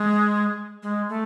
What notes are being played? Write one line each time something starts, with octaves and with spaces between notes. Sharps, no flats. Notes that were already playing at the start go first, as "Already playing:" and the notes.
Already playing: G#3
G#3
A3